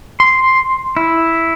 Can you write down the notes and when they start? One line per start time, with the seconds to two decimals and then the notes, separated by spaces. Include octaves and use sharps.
0.20 C6
0.97 E4